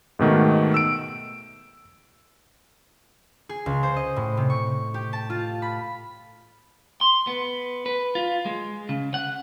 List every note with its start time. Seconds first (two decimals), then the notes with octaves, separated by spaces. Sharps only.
0.19 G#2 B2 D#3 A3
0.74 E6 D7
3.49 G#4
3.66 C#2
3.83 C5
3.96 D#5
4.16 A2
4.37 C3
4.50 C#6
4.94 G4
5.13 A5
5.30 F4
5.62 B5
7.01 C6
7.27 B3
7.86 B4
8.15 F4
8.46 G#3
8.89 C#3
9.14 F#5